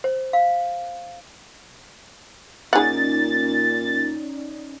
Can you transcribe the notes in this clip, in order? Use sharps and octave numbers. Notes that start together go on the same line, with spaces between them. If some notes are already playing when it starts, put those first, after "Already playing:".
C5
F5
A#2 C#4 D#4 G#4 D5 F#5 A6